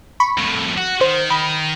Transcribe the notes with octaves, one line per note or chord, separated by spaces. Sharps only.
B5 C#6
F2 A2
F#4
D#3 C5
D#3 B5